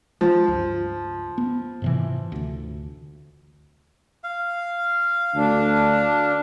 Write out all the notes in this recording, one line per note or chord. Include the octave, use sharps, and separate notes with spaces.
F3 G#3
C#2 G2
B3
G#2 C3 E3
D2
F5
D2 D4